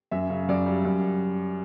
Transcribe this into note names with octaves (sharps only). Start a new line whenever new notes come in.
F#2 E5
C#3
F#2 D5
G3
F#2